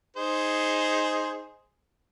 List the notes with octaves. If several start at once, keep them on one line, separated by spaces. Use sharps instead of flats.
D#4 G#4 C5